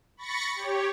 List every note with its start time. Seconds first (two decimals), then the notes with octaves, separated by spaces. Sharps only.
0.17 B5 C#6 A6 A#6 C#7
0.55 G4 C#5